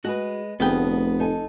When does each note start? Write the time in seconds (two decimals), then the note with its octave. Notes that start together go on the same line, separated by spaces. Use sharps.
0.05 G#3 F#4 G#4 B4
0.60 F1 D2 B3 G#4 G5
1.19 D#4 A4 G#5